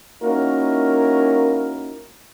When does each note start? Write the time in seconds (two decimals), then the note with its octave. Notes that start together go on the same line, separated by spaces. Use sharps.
0.23 A#3 C#4 D#4 E4 F#4 A#4